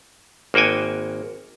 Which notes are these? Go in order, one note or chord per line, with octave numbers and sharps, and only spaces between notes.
G#1 A#3 F#4 G5 G#5